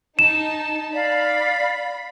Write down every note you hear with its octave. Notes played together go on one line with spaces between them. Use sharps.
D#4 A5 E7
D5 F5 B5